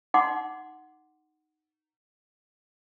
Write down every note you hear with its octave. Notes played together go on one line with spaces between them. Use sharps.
D#4 F#5 C6 D6